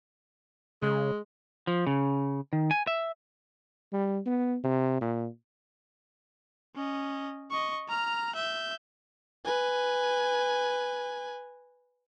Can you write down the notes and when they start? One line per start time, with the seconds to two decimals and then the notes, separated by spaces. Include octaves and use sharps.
0.82 C#3 G#3
1.67 F3
1.87 C#3
2.53 D#3
2.71 G#5
2.87 E5
3.92 G3
4.26 B3
4.63 C3
5.01 A#2
6.76 C#4 D#5
7.51 D#5 C#6
7.88 A#5 F6
8.35 E5 G6
9.45 B4 G#5